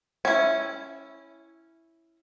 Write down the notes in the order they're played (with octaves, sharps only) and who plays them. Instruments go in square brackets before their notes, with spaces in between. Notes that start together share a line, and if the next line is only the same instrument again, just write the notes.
[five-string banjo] C#4 E4